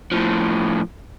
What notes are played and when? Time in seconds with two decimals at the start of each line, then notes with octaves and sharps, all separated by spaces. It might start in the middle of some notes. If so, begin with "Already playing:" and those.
0.12 A2 F3